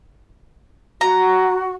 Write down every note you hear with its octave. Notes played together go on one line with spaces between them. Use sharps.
F#4 A#5